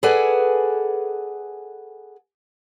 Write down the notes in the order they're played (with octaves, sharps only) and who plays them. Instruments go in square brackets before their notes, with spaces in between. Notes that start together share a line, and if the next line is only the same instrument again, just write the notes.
[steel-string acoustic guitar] G#4 A4 B4 D5 F#5 G#5